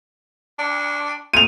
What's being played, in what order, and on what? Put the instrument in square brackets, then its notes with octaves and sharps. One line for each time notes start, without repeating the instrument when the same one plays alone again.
[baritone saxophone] D4
[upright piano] D#7 F7